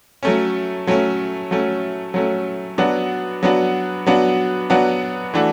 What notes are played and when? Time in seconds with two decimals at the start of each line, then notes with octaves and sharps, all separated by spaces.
0.23 F#3 A3 C#4
0.87 F#3 A3 C#4
1.51 F#3 A3 C#4
2.14 F#3 A3 C#4
2.78 F#3 B3 D4 F#4
3.43 F#3 B3 D4 F#4
4.06 F#3 B3 D4 F#4
4.70 F#3 B3 D4 F#4
5.34 E3 A3 D4 F#4 A4